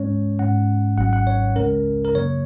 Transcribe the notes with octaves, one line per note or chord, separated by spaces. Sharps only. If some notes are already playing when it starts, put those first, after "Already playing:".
Already playing: G#2 G#3 C#4 C#5
G#2 G#3 C#4 F#5
G#1 G#2 F#3 C#4 F#5
F#5
C#5
C#2 C#3 G#3 C#4 A#4
A#4
F#2 C#3 F#3 A#3 C#5